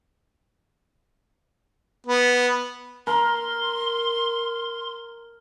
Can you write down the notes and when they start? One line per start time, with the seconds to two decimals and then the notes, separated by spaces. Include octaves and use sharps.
2.07 B3
3.07 A#4 C6